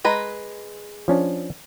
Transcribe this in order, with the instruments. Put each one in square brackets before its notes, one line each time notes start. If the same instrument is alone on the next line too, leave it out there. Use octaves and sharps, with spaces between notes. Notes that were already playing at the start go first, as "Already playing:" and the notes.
[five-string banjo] G#3 B4 A#5
[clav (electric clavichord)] F3 C#4 D4